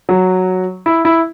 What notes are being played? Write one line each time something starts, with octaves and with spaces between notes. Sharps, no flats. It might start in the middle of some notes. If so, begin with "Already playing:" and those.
F#3
E4
E4